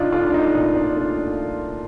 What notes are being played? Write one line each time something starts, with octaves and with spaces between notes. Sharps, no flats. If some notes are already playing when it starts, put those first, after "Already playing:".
Already playing: C2 D4 D#4 F4
A3 D4 F4
D4
D#4
A#2 D#4
D4
A3 D4